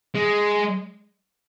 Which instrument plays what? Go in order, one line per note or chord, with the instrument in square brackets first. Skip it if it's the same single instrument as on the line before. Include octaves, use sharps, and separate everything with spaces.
[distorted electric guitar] G#3